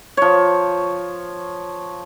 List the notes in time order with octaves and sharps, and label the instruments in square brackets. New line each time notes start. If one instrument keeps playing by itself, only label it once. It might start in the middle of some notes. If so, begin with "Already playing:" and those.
[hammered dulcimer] F3 C#5